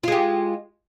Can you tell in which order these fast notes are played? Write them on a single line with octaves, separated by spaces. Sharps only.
F4 G#3 G4